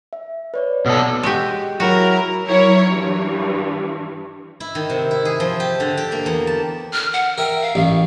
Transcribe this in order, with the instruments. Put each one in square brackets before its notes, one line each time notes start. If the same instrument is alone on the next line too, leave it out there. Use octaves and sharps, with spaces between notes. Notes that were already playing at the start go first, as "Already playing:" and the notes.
[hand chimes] E5
B4 C#5 D5
[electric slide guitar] B2 A4
[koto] G#3 F#4 G4
[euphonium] F#3 [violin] E4 A#4 [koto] F#4
[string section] F#3 E4 A#4 C#5
G2 E3
[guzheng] E4
D#3
C3
E4
G#4
F3
G4
D3
G4
A#3
E2
A5
[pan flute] F6
F#5
[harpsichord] A#4 E5 [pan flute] G5
[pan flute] F5
[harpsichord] A1 [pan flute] F5